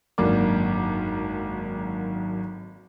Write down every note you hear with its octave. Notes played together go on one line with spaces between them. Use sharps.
G#1 F#2 D3 A#3 D6